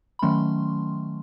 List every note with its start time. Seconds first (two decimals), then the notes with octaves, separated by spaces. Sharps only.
0.19 B5
0.22 D#3 F#3 A3 C#4 C6